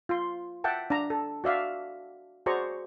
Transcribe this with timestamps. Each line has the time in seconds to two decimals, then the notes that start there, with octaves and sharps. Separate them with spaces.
0.09 F4 C6
0.64 E5 F#5 G5 A5
0.90 D4 A#5
1.10 A4
1.44 F#4 D5 E5 F5
2.46 F#4 G#4 C5 D5 A#5 C#6